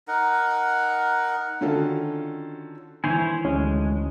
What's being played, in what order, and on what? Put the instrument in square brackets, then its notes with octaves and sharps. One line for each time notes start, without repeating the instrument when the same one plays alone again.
[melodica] D#4 A#4 F#5
[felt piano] D3 D#3 C#4 F4 F#4 A4
[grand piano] D#3 E3 [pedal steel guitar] E4 C5 C#5 [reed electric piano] G#5
[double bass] D2 [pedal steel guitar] G#3 [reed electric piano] C#4